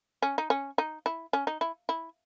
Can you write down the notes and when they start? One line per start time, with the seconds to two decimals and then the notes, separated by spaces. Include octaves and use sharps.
0.22 C#4
0.38 D#4
0.50 C#4
0.78 D#4
1.06 E4
1.33 C#4
1.47 D#4
1.61 E4
1.89 E4